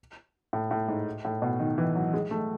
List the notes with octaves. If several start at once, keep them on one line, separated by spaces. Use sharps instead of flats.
A2
A2
G#2
A2
B2
D#3
E3
F#3
G#3
A3